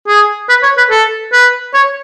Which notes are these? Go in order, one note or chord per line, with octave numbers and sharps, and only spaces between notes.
G#4
B4
C#5
B4
A4
B4
C#5